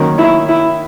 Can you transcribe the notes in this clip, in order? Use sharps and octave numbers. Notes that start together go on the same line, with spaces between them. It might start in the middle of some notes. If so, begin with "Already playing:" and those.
Already playing: D#3 F#3 A#3 C#4
E4
E4